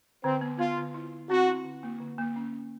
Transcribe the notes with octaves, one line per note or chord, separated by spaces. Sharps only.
D3 C4
B3
B3 F4
D3
E4
E4
C4 F#4
E4
D3
A#3
D3
A#3
C#4
C#4